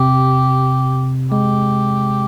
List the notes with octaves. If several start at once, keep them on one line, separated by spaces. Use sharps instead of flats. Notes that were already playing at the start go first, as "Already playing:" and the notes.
Already playing: C3 G4
G#3 G4